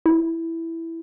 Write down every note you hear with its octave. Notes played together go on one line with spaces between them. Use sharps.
E4